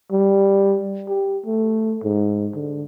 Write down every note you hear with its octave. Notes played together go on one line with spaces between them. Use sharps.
G3
G4
A3
G#2
D3